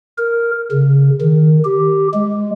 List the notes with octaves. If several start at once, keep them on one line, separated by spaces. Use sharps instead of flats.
A#4
C#3
D#3
G4
G#3